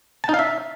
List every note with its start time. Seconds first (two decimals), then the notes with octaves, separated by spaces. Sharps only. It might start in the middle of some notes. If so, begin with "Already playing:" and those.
0.24 A5
0.29 D#4
0.34 F5
0.39 E5